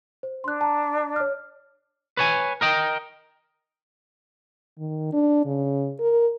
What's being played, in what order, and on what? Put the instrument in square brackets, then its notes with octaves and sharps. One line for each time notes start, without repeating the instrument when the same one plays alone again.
[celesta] C5
[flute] D4 [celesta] C6 F#6
[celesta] A5 A#5
C#5 F6
[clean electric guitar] B4 C#5 G#5
A#4 D#5 G5
[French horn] D#3
D4
C#3
A#4